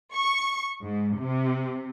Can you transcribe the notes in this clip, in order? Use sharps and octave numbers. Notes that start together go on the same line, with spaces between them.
C#6
G#2
C3